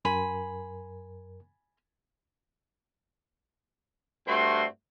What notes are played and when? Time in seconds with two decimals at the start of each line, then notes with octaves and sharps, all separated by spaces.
0.05 F#2 A#4 G#5 B5 C6
4.28 G2 G3 A3 C4 F#4 C6